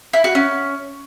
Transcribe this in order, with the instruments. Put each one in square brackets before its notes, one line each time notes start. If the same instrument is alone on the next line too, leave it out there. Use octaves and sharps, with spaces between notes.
[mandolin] E4
F#4
C#4